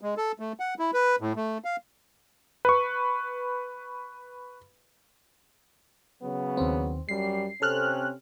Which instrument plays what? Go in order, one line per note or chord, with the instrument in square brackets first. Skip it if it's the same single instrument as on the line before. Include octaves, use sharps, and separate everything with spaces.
[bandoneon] G#3
A4
A3
F#5
E4
B4
A2
A3
F5
[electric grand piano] B4 C#6
[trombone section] C#3 F#3 B3
[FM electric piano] D#2 C4
[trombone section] F#2 G3 [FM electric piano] C7
[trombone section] C3 C4 C#4 [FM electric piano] A4 F6 F#6